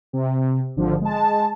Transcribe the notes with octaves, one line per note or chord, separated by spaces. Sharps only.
C3
G#1 D3 F3
G#3 A5